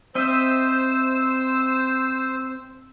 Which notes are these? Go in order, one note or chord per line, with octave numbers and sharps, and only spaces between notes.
C4 C5 D#5 E5 E6